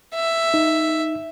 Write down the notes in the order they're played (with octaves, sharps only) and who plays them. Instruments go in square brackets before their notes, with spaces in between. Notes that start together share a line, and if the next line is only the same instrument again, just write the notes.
[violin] E5
[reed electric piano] D#4